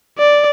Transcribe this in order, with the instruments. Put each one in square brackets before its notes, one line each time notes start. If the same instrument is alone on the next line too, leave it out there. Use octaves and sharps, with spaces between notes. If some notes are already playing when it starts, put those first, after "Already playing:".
[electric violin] D5